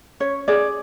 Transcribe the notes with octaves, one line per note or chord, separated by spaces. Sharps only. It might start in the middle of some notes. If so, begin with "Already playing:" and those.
C#4 C#5
G#4 D5